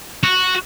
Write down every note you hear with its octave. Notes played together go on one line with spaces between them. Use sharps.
F#4